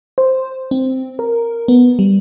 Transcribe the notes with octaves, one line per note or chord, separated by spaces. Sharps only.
C5
C4
A#4
B3
G3